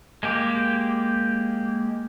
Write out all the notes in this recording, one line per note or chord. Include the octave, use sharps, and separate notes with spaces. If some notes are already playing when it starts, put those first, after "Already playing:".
G#3 A#3 G4